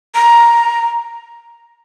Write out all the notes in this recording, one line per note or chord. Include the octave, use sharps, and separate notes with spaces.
A#5